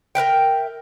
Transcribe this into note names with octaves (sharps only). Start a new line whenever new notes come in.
A#4 B4 E5 G5